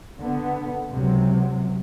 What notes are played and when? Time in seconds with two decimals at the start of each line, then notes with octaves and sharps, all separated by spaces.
0.19 D3 B3
0.91 C#2 C3 F#3